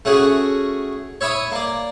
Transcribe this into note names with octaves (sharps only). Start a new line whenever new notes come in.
A3 C#4 F#4 G#4
C#5 E5 B5 C#6 D#6
A#3 D5